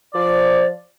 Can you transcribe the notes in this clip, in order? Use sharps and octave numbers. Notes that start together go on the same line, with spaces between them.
F3 D5